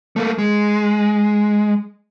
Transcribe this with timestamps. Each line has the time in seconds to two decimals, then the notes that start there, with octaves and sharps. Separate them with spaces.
0.16 A3 A#3
0.38 G#3